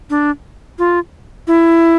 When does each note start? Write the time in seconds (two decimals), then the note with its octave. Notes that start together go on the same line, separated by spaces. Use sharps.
0.10 D4
0.79 F4
1.47 E4